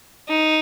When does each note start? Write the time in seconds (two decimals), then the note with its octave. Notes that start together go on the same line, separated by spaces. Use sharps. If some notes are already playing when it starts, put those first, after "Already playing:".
0.28 D#4